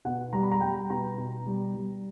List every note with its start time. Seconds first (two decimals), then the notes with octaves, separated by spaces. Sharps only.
0.05 B2 F#5
0.33 G3 A#5
0.43 B5
0.51 A#5
0.61 G3 G5
0.90 B2 A#5
1.18 B2
1.46 G3
1.75 G3